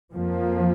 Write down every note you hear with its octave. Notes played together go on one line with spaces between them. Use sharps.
F2 F3 A#3